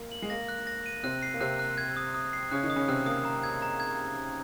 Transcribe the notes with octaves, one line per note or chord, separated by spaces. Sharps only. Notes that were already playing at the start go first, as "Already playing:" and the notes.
Already playing: A#3
F#7
G#3
A#3 A#6
F#6
A#6
D#7
C3 C4 F#6
C7
A#3
C3 C4 F#6
F#6
G#6
D#6
D#6
C7
C#3 C#4 F#6
D#3 D#4
D#6
C#3 C#4
C3 C4 F#6
A#3 D#6
A#5
G#6
A#5
G#6